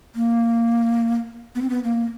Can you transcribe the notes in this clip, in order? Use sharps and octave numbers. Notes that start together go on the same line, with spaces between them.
A#3
B3
C4
B3
A#3